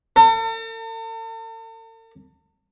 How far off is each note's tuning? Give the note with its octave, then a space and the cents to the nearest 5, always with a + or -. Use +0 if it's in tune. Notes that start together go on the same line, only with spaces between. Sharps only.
A4 +45